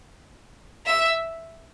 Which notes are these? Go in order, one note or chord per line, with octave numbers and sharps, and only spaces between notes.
E5